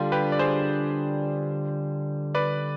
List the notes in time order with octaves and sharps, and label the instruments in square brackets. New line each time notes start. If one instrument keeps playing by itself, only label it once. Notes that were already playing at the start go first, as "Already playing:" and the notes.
Already playing: [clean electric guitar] D3 G3 D4 F4 [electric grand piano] G4
[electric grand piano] G4 B4
D5
G#4 C5
B4 D5